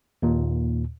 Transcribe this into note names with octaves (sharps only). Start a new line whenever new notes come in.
D#2 A#2